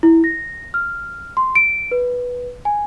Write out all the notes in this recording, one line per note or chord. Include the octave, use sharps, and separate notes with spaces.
E4
A#6
F6
C6
D7
B4
G#5